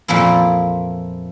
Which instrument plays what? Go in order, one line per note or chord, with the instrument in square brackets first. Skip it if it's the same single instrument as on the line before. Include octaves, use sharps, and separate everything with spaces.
[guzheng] F2 A#2 F3 A#3 E4